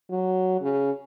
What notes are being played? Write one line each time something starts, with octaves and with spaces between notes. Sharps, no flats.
F#3
C#3